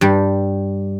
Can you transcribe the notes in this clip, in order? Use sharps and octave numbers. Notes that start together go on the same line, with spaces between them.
G2 G3